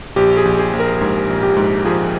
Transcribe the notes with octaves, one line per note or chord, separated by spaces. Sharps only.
A#1 G4
G#4
A#1
G#4
A#1
A#4
G#2
A#1
G4
G#2
F3 G#4